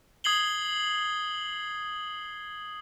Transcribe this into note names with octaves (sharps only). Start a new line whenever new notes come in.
D#6 G#6 C7 F#7 G7